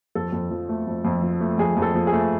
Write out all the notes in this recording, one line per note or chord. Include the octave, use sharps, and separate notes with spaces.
F2 A4
F2
F3
A3
F2
F2
F3
A3
F2 G#4
F2
A4
F3
G#4
A3